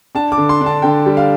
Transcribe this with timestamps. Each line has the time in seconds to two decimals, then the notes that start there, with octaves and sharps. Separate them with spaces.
0.15 D4 A5
0.32 D6
0.38 D3
0.49 C6
0.61 D4
0.66 A5
0.82 D3 G5
1.06 G3
1.17 F5